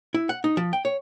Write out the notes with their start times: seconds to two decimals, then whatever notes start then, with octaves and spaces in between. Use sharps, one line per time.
0.14 E4
0.29 F#5
0.44 D#4
0.57 F3
0.73 G5
0.85 C#5